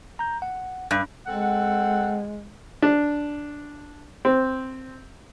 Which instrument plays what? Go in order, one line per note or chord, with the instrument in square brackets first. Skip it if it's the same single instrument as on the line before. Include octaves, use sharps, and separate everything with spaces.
[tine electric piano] A#5 G6
F#5
[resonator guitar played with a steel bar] G2
[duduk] G#3 [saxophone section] C4 A4 F#5
[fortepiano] D4
C4